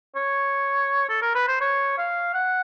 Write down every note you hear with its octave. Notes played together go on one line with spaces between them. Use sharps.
C#5
A4
A#4
B4
C5
C#5
F5
F#5